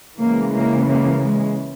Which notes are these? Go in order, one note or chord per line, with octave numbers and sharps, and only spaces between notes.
C#3 E3 G#3 A#3
A#3
A#3
G#3